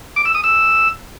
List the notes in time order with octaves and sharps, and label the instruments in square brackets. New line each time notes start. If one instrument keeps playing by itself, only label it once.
[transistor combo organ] D6
E6
D#6
E6